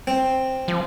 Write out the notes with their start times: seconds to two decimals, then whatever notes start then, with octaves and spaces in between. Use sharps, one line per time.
0.07 C4
0.68 F3